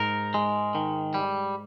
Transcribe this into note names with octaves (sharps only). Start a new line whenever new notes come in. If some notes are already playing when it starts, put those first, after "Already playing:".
Already playing: G#2 D#4 A#4
G#3
D#3
G3